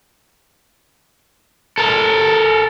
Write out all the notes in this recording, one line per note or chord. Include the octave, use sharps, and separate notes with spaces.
A4 A#4